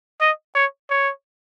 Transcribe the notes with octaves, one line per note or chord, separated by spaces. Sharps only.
D#5
C#5
C#5